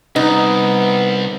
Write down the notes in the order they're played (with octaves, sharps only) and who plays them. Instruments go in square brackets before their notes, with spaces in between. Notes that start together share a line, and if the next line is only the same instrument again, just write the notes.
[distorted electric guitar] C2 [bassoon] B3 [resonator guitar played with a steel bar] D#4